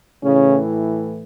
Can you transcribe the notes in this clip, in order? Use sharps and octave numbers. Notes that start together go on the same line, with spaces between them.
A2 C#3 E3 C#4